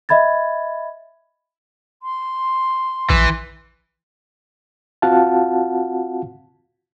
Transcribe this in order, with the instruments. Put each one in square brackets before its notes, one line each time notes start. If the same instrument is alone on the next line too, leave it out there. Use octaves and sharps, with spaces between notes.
[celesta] D#5 E5 B5 G#6 A6
[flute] C6
[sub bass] A#1 [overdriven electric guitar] E3
[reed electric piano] C4 F4 F#4 F5 F#5 A5